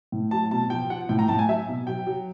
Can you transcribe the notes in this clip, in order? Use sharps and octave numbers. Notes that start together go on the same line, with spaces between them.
A2
F#3 A5
B2 A5
F3 G5
F3 F#5
A2 G5
A#5
A2 A5
G#5
F#3 E5
B2
F#3 G5
F#3